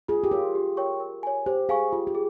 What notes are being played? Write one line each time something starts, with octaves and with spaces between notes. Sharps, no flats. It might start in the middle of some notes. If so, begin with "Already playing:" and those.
F4 G#4
G4
F4 A#4 C#5
G4
A#4 C#5 G5 C#6
A#4
C#5 G#5
G4 C5
G#4 F5 G#5 C#6
F4 G4
G4
G#4